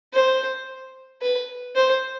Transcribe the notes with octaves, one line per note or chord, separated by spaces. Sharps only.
C5
B4
C5